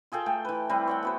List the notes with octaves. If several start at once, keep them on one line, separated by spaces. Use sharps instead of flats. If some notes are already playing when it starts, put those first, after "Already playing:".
F4 G#4 A4 G5
A3 G5
E3 B4
G3 C4 E4 B4
C#5 F#5 G5
B3 F#4 C5